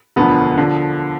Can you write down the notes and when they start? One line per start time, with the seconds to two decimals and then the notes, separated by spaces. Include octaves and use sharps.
0.16 E1 D2 D3 F3 B3
0.57 D3 F3